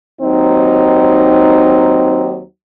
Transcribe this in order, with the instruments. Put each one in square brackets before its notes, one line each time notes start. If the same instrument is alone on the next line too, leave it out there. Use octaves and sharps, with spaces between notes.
[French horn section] D#2 F#3 C4 D#4